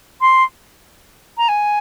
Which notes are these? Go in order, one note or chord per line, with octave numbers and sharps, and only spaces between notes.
C6
A#5
G#5